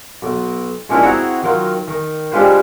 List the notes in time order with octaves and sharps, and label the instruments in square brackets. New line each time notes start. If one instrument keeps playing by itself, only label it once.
[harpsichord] B1
A#1 G#3 C#4 D4 E4 F4
C4 E4 F#4 G#4 C#5 A#5
D#3 F#3 F4
D#3
G3 G#3 D4 F4 B4 C5